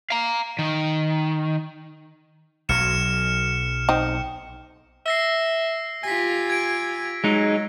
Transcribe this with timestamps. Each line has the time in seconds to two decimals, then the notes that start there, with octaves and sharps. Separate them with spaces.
0.10 F5 A#5
0.59 D#3
2.69 B1 F#3 F6 C#7 E7
3.89 C4 D#4
5.06 E5 E6 A#6 C7
6.04 F4 G4 G#5 A#6 B6
6.50 G#6 D7
7.24 F#3 G#3 D#4